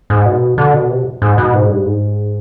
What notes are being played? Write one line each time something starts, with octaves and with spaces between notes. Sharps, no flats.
G#2
B2
D3
B2
C3
G#2
B2
G#2
G2
G#2